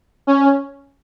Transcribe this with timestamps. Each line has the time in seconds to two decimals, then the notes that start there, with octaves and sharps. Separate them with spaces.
0.27 C#4